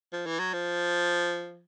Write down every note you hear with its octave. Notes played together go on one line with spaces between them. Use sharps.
F3
E3
F#3
F3